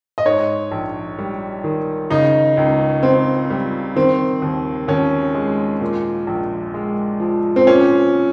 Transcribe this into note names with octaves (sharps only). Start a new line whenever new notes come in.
D#5
G#2 C#5
A#1
G3
D#3
C#3 D#4
C#2
C#2 C4
G3
D#3 C4
D#2
D#2 C#4
G#3
A#2
A#1
G#3
F3
C4
A#2 C#4